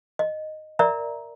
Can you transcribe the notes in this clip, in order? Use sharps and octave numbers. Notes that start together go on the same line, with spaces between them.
D#5
A#4 D5 E5 A#5